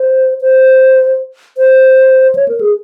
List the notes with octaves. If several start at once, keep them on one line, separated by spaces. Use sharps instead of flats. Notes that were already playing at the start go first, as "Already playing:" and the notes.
Already playing: C5
C5
C5
C#5
A#4
G#4